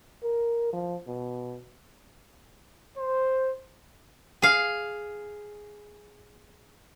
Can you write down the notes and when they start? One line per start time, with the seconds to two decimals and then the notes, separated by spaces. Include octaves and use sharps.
0.24 A#4
0.73 F3
1.07 B2
2.98 C5
4.42 G#4 F5